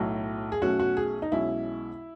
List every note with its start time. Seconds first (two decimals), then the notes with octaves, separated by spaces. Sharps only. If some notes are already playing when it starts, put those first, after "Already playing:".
Already playing: B1 A2 F#3
0.52 G#4
0.62 B1 B2 A3 C#4 F#4
0.80 F#4
0.97 G#4
1.22 D#4
1.32 B1 B2 G#3 C#4 E4